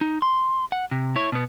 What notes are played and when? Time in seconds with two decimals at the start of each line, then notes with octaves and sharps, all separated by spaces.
0.01 D#4
0.22 C6
0.72 F#5
0.91 C3
1.16 E4 C#5
1.32 B2 B3